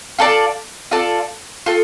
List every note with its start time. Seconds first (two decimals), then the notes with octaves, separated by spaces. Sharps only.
0.19 F4 A4 D5 A5
0.91 F4 A4 D5 A5
1.66 F4 A4